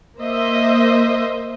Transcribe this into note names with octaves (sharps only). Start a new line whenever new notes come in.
A#3 C5 D#5 E5